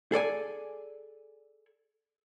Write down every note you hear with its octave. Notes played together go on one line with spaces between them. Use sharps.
G#4 A4 D5 G#5